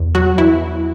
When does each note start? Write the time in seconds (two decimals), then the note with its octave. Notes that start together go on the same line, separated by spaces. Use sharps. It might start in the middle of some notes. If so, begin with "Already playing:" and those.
Already playing: E2
0.15 F#3 F#4
0.38 E2 E3 E4